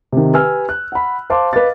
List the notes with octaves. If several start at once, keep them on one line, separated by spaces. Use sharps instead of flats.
C3 D#3
G4 B4 G#5 E6 F6
F#6
F#5 B5
C5 F5 A5 C6 D6
B4 D#5 F5 D6 A6